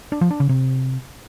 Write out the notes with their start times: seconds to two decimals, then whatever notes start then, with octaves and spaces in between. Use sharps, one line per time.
0.12 D4
0.21 F3
0.31 D4
0.40 C#3
0.49 C3